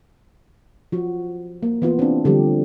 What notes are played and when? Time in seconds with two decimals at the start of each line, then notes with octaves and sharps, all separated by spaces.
0.92 F3 F#4
1.63 A#3
1.82 E3 B3 F4
1.99 C4 D4
2.25 D3 F3 G3 G4